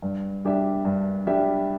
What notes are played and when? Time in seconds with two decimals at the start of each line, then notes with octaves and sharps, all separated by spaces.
0.02 G2
0.45 G3 D4 G4 E5
0.85 G2
1.27 G3 D4 G4 E5